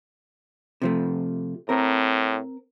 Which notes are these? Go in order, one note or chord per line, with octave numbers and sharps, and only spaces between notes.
C3 F3 A3
A2 C4 A#4